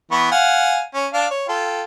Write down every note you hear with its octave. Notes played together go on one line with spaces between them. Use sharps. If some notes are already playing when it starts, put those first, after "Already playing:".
E3 B3 C#6
F5 F#5 G#5
C#4
D4 F5
C#5
F4 A4 G5